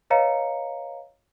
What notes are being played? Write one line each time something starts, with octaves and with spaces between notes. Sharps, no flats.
B4 C#5 D#5 F5 A#5 C#7